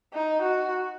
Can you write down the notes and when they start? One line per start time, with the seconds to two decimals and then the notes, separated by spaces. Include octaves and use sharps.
0.14 D#4
0.43 F#4